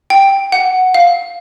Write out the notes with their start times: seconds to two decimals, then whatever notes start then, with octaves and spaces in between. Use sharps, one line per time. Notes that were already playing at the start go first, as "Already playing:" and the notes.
0.10 G5
0.52 F#5
0.94 F5